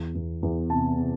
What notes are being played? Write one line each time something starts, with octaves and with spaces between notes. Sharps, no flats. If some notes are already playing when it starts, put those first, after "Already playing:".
Already playing: E2
E2
E2
C3 A5
C3